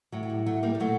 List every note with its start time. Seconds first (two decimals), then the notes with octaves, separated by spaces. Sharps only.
0.12 A2 F#3
0.23 F#3
0.30 G3
0.46 F#3 A3
0.63 G3 A#3
0.75 G3
0.80 A#2 F#3 A3